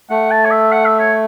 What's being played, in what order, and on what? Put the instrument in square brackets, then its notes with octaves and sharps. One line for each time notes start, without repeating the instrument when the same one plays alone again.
[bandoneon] A3 [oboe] F#5
[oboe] A5
C#5
E5
F#5
E5
C#5